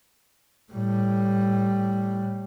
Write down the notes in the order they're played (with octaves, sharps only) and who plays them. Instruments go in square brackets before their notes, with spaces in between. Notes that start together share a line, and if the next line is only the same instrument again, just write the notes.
[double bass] A2 G3